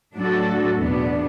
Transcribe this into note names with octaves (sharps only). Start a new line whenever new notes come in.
A2 F#3 D4 F#4 A4
E2 B2 B3 D4